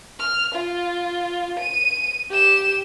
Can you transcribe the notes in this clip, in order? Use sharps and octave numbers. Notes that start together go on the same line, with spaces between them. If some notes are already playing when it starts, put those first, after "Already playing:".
F6
F4
D#7
G4 E7